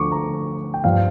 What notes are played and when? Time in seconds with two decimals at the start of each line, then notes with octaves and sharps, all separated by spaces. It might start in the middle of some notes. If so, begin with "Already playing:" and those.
Already playing: D2 D3 F3 C#6 D6
0.12 A#5
0.74 G5
0.84 G2 F3 F5